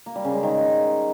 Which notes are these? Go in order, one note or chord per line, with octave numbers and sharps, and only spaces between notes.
A#3
G3
C#3
G#3
D#3